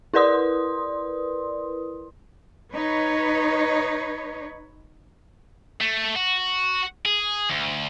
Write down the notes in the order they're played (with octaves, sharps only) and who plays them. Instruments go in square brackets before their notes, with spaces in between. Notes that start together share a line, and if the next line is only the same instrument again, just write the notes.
[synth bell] E4 A#4 B4 D5 C6 D#6
[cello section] D#4 B4 C#5
[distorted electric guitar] A3
F#4
G#4
D2